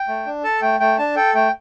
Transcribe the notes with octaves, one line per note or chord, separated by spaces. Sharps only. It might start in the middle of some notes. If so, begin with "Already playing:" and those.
Already playing: G5
A3
D4
A4 A5
A3 G5
A3 G5
D4 A5
A4 G5
A3 G5